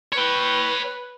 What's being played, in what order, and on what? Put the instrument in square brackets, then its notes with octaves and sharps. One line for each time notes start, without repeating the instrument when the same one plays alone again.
[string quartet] B4 [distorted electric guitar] C#5 G5